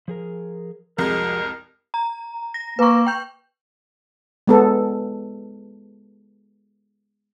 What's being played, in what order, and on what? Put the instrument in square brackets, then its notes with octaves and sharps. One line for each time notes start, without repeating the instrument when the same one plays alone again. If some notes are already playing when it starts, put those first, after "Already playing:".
[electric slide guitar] F3 G#4 A#4
[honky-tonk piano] C2 F2 G#3 [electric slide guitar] F3 F#4 G#4 [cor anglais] A#4
[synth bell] A#5
A#6
[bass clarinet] A#3 [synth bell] B4 C#6
[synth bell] G5 G6
[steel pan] G#3 B3 A4